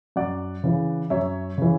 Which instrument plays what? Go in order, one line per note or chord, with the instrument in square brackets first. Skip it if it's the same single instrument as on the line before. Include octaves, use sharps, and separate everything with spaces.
[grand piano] F#2 D5 F#5
C#3 E3
F#2 C#5 E5
C#3 E3